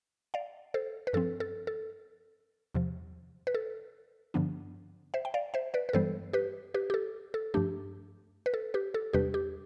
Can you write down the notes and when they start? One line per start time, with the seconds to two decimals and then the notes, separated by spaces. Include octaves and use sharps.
0.34 D5 F5
0.74 A4 C5
1.07 B4
1.13 G2 F3 C4 A4
1.40 A4
1.67 A4
2.75 E2 C3 F3
3.47 B4
3.55 A4
4.34 G2 D3 F3 B3 D4
5.14 C5 E5
5.25 G5
5.34 D5 F5
5.54 C5 E5
5.74 B4 D5
5.89 B4
5.93 G2 E3 G3 B3 A4 C5
6.33 G4 B4
6.74 G4 B4
6.90 G4
6.94 A4
7.34 A4
7.54 G2 F3 A3 D4 G4
8.46 B4
8.54 A4
8.74 G4 B4
8.94 A4
9.13 E2 C3 G3 D4 G4 B4
9.34 G4